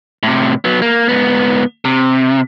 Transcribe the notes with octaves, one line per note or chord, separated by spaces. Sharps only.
A2 C3
F#3 B3
A#3
G#2 B3
C3